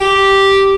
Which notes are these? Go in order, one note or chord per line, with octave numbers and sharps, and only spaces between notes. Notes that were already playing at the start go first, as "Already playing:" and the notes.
G4